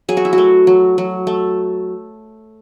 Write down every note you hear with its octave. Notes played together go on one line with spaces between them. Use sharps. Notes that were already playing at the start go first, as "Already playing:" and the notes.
F#3 G#4
F#4
E4
F#4
A3
F#3
F#3
A3